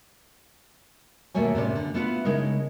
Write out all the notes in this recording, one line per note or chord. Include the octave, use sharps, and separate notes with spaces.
D#2 B2 A3 A#3 C#5 G#5
A2 C3 B3 C#4 C5 D5
D3
A3 B3 E4 F4 G4 B4
C#3 G#3 D#4 E4 A#4